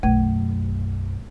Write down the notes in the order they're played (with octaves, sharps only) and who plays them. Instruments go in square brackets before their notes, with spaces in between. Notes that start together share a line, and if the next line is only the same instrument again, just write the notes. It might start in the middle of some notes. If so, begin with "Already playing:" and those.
[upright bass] B1 F#2 [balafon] A3